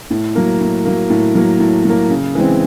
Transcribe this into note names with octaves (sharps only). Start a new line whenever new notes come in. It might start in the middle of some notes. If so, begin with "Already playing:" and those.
A2
F#3 A#3
A2
F#3 A#3
A2
F#3 A#3
A2
F#3 A#3
C#3
E3 G#3 C4